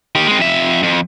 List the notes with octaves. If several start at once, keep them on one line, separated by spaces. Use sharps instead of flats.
D#3 G4
G#3 C4
F2 E5
F2